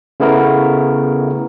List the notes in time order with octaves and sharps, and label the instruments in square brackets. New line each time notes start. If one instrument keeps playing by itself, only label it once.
[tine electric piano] C#3 A3 B3 E4 A#4